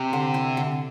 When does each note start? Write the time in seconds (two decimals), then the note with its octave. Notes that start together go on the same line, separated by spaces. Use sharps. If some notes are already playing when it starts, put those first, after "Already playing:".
Already playing: C3 C4 G4
0.13 D3
0.34 E4
0.57 D3